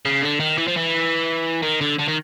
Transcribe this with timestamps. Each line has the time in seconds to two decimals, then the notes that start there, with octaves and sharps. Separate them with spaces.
0.05 C#3
0.22 D3
0.40 D#3
0.58 E3
0.68 F3
0.77 E3
1.63 D#3
1.81 D3
1.99 D3
2.08 D#3